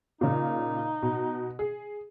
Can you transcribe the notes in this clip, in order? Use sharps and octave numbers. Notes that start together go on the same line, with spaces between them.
A#2 C#3 D#4
B2
G#4